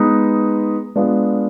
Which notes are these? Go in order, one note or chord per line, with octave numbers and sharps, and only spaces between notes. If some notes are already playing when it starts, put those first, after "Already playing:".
Already playing: G#3 B3 D#4 B4
G#3 B3 D4 F4